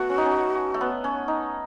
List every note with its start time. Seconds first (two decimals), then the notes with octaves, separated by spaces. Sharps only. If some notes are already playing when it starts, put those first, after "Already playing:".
Already playing: A3 B3 F#4
0.10 C#4
0.18 D#4
0.26 C#4
0.74 A3
0.81 B3
1.04 C#4
1.28 D#4